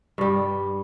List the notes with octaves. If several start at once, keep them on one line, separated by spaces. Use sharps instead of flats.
G2 G3